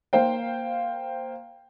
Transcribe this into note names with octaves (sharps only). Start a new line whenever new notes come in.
A#3 C5 F5 G5